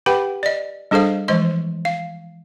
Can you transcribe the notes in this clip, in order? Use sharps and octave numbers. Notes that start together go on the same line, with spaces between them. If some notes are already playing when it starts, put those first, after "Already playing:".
G4 B4 F#5 G5 B5
D5 D#5
G3 D4 G#4 A4 C5 F5
E3 F3 G#3 C5 D#5 C6
F5